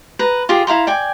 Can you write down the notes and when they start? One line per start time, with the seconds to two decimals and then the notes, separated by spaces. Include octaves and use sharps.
0.19 B4 A#5
0.49 F4 G4 G#4
0.67 E4 F5 A#5 C6
0.87 D5 G5 G#5